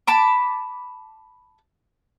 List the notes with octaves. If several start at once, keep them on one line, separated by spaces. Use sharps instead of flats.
A5 B5 D6